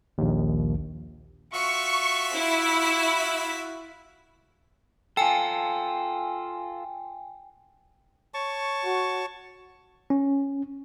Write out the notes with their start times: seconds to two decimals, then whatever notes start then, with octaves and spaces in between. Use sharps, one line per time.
0.18 A#1 D#2
1.53 F4 F#4 E5 C#6
2.34 E4
5.17 F4 A4 G5 G#5
8.34 C#5 A5 C#6
8.84 F#4
10.10 C#4